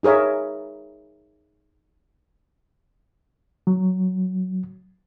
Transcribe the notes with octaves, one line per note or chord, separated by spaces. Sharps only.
D#4 G#4 A#4 C#5 E5
F#3